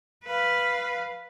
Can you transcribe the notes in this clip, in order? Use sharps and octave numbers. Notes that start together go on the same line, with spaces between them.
B4 F5